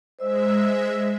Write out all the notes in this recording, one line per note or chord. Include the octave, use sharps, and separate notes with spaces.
G#3 C5 D#5 E5 E6